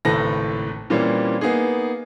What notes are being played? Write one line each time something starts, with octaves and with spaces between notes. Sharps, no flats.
G#1 C#2 A2 A4 B4 A#6
A#2 E3 G3 A#3 C4 C#4
A#3 B3 D#4 G#4